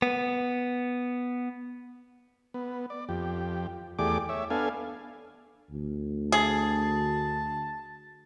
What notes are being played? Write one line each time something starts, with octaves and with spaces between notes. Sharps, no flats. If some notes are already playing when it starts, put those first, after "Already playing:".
B3
B3
D5
F2 G4
E2 A3 G4 G#4 D5 D6
C#5 E5
B3 D4 A4 F5 G#5
D2
G#4 A5